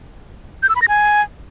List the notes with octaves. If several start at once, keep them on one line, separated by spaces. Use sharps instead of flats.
G6
E6
B5
A#6
G#5